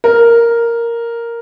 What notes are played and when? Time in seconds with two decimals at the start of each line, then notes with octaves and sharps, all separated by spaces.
0.04 A#4